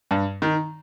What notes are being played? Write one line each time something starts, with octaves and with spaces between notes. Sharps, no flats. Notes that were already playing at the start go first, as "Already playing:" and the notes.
G2
D#3